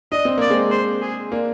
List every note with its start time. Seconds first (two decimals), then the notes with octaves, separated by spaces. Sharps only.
0.12 D4 D#5
0.25 C4
0.38 A#3 D5
0.50 G#3 C4
0.71 C5
1.02 G#4
1.31 A#3 D4